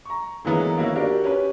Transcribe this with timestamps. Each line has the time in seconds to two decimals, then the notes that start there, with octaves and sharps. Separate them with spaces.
0.05 A#5 C#6
0.45 D3 E3 F#3 G#3 A#3 B3
0.77 D#3 A#3 C#4 E4 F#4
0.95 D4 F#4 G4 A#4
1.24 C#4 G4 B4